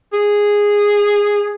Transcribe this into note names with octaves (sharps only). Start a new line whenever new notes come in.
G#4